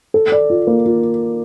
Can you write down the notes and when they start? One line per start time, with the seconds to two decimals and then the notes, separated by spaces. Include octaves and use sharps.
0.14 A4
0.32 D5
0.50 F4
0.67 A#3
0.86 F4